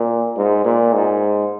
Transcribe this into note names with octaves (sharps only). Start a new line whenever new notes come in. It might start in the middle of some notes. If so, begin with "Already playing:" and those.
Already playing: A#2
G#2
A#2
G#2